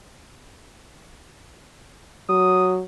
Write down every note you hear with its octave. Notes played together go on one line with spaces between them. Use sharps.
F#3 D#6